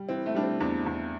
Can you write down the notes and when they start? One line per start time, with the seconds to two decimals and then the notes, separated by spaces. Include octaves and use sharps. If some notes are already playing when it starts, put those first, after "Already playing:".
Already playing: G3
0.09 E3 C4
0.26 A3
0.35 G3 D4
0.43 C4
0.60 E2 D4
0.86 E2